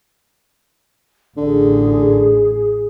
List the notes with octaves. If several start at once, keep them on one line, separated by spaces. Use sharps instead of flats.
A1 D3 G#4